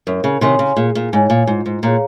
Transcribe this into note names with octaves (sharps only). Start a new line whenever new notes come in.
F#2 A#4
C#3
C3 D#3 C#5 G#5 C6
C#3
A#2 G#4
A#2
G#2 C#5 G#5
A#2
G#2 F4
G#2
A#2 G#4 C#5 F5 A#5